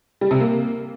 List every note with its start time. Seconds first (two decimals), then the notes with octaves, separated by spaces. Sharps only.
0.21 G3
0.31 C3
0.40 A#3